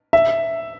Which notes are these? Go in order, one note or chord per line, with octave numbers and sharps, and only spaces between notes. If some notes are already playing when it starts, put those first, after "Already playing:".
E5